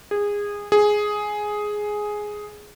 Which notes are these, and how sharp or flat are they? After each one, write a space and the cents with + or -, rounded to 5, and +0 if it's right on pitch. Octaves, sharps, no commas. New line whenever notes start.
G#4 -20
G#4 +5